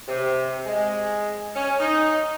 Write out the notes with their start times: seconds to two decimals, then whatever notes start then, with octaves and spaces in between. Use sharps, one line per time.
0.08 C3
0.66 G#3
1.55 C#4
1.80 D#4